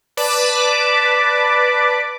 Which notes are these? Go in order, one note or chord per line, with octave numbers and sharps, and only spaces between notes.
B4 D5 A5 B5 D6